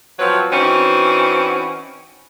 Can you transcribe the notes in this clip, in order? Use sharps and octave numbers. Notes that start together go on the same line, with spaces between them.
F3 F#3 C4 B4 C#5
E3 C4 C#4 D#4 F#4